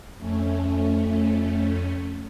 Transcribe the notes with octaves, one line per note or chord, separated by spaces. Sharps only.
F2 A3 C#4